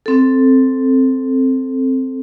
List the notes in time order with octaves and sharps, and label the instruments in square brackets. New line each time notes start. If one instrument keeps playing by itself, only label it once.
[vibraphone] C4 A4